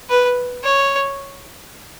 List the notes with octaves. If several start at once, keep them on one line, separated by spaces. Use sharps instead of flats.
B4
C#5